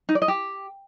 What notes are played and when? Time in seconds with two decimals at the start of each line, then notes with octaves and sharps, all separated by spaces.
0.09 D#4
0.15 D5
0.22 D#5
0.28 G4